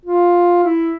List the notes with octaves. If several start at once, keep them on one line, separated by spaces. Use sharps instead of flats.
F4
E4